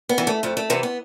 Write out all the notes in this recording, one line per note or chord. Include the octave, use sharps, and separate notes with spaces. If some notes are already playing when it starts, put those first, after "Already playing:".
B3
E3
A3
F2 A3
A3
C3 E3 B3
B3